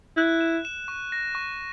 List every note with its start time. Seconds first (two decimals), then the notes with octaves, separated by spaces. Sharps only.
0.17 E4 F#6
0.41 E7
0.65 E7
0.88 C#6
1.12 A#6
1.35 C#6